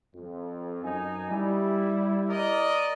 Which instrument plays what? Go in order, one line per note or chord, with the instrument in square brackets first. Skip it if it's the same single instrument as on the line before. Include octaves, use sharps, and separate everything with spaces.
[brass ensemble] F2
F#2 D#4 G#5
G3 E4
[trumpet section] A#4 D5 D#5